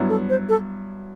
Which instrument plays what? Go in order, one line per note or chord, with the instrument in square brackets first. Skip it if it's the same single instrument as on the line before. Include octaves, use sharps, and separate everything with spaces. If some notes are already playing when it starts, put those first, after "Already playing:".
Already playing: [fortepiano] G2 F#3 B3 E4
[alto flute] A4
C5
A4